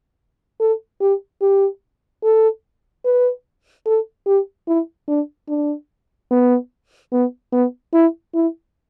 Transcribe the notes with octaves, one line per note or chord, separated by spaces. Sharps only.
A4
G4
G4
A4
B4
A4
G4
E4
D4
D4
B3
B3
B3
E4
E4